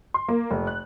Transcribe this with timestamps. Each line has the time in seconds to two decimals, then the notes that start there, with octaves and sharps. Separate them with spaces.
0.14 C6
0.28 A#3
0.51 F1
0.67 F#6